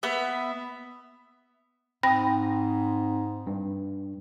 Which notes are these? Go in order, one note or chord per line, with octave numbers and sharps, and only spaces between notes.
B3 E5
G#2 C4 G5 B5 D#6 A#6
G2